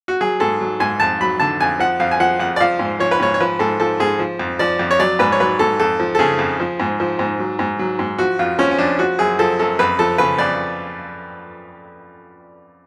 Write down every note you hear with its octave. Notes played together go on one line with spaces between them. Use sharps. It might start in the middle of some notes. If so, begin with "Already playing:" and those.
F#4
F#3 G#4
G#2 A4
F#3
G#2 G#5
F2 A5
F#3 B5
D3 A5
F2 G#5
F3 F#5
F2 F5
G#5
F3 F#5
F2 F#5
D5
F3 F5
G#2
F3 C#5
B4
G#2 C#5
C#5
F3 B4
G#2 A4
F3 A4
G#2 G#4
F3
F2
F3 D5
F2
C#5
F#3 D5
G#2 B4
C#5
F#3 B4
G#2 A4
F2 A4
F3
A4
C#3 G#4
F2
F3
G#2
F3
G#2
F#3
G#2
F#3
G#2
F3 F#4
F2 F4
F3 C#4
C#4
F2 D4
F3 F#4
F#2 G#4
F3 A4
F#2 A4
F2 B4
F3 A4
C#3 B4
F2 D5